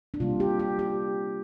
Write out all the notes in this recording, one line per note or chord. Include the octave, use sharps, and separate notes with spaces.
D4
C3 G3 A#3 F4
G4
G4
G4